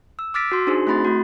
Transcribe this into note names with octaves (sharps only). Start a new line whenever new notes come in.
E6
D6 E6 F6 A6 B6 D7
F#4 C6
D4 D#4 F#4 G#4 C5
A3 C4 E4 B5 C6 A6
A3 F#4